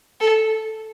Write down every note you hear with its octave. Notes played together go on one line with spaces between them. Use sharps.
A4